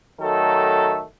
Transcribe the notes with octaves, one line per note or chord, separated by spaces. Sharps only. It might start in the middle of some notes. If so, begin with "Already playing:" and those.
D#3 F#3 A3 A4